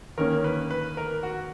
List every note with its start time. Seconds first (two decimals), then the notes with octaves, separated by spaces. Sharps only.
0.18 D#3 A#3 C#4 A#4
0.44 B4
0.71 B4
0.97 A#4
1.23 F#4